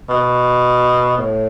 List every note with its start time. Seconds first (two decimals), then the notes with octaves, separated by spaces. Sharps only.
0.09 B2
1.18 A2